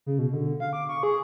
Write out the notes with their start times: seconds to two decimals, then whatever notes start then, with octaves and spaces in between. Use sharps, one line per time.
0.06 C#3
0.19 B2
0.33 D3
0.60 F5
0.73 D6
0.89 C#6
1.03 G#4